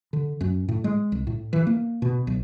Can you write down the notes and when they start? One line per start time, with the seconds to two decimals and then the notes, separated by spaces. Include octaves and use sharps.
0.13 D3
0.41 F#2
0.68 A2
0.84 G#3
1.12 C2
1.27 A2
1.53 E3
1.67 A#3
2.02 B2
2.27 B1